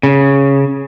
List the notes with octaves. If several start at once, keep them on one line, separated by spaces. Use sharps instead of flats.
C#3